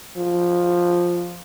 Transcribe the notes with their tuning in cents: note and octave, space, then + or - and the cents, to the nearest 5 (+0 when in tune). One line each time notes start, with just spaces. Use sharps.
F3 +5